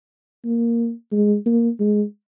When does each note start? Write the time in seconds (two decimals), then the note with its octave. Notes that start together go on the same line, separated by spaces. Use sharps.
0.45 A#3
1.12 G#3
1.46 A#3
1.80 G#3